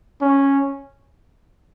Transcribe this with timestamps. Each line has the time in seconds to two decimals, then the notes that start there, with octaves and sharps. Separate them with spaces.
0.22 C#4